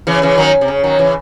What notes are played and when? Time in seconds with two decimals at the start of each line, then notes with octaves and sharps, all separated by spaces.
0.07 C#3 E3
0.22 C#3 E3
0.38 D#3 F#3
0.61 C3
0.68 C#3
0.84 D#3 F#3
0.99 C#3 E3